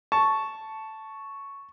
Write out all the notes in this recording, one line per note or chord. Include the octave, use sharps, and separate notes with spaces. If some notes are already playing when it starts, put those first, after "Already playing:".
A5 C#6